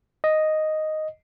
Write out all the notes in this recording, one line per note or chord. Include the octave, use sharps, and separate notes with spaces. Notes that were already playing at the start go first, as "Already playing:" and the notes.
D#5